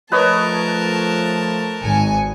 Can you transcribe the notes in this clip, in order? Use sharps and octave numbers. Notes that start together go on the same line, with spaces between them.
F3 A3 A#4 B4 C#5 D#5 A5
G#1 G#5 C#7